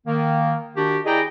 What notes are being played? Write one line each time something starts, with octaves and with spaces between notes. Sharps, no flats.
D#3 A#3
D#3 D4 F#4 G4
E4 G#4 D5 D#5 G5 A#5